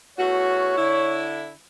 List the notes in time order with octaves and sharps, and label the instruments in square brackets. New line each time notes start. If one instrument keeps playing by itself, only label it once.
[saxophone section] E2 A3 F#4 [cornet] C#5
[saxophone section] D3 E4